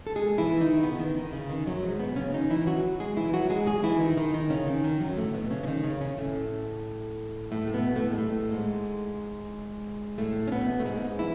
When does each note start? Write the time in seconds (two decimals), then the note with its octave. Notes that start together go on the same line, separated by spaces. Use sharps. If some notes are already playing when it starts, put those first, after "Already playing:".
0.07 A4
0.16 G#3 G#4
0.38 E3 E4
0.61 D#3 D#4
0.83 B2 B3
0.92 C#3
0.99 D#3
1.16 D#3
1.33 C#3
1.50 D#3
1.67 F#2 F#3
1.83 G#2 G#3
1.99 B2 B3
2.16 C#3 C#4
2.34 D#3 D#4
2.50 E3 E4
2.67 F#3 F#4
3.00 G#3 G#4
3.17 E3 E4
3.33 F#3 F#4
3.50 G#3 G#4
3.66 G#3 G#4
3.84 E3 E4
4.00 D#3 D#4
4.17 D#3 D#4
4.34 D#3 D#4
4.50 C#3 C#4
4.67 D#3
4.84 D#3
5.00 F#2 F#3
5.17 A2 A3
5.34 B2 B3
5.50 C#3 C#4
5.63 C#4
5.67 D#3 D#4
5.84 C#3 C#4
6.01 C#3 C#4
6.17 A2 A3
7.51 A2 A3
7.67 A3
7.74 B2 B3
7.96 A2 A3
8.13 G#3
8.18 A2 A3
8.51 G#2 G#3
10.18 A2 A3
10.48 C#4
10.52 B2 B3
10.80 A3
10.85 G#2 G#3
11.19 E3 E4